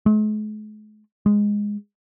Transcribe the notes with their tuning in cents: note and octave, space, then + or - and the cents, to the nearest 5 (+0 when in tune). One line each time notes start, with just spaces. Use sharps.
G#3 +45
G#3 -10